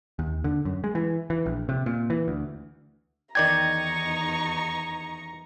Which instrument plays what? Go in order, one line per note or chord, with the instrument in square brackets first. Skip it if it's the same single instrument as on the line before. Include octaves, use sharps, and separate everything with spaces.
[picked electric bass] D#2
D3
F#2
G#3
E3
E3
A#1
C3
A#2
E3
D2
[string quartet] E2 D#4 C#6 [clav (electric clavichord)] D#3 D5 G5 [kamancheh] A#5 [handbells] G#6